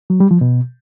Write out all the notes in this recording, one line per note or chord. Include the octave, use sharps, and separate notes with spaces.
F#3
G3
F3
B2